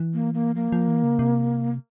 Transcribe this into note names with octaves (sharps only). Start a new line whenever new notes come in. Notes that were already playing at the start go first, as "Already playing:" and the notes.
Already playing: E3
A#3
A#3
F3 A#3
F3
E3
C#3
C3